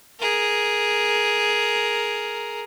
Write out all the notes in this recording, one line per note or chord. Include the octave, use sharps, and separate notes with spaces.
G#4 A#4